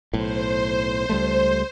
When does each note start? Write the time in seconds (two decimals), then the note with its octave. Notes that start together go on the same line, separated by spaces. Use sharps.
0.13 B1 A2 C5
1.09 C#2 G3 A3